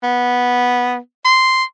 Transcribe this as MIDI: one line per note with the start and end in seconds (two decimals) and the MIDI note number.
0.03 0.97 59
1.25 1.64 84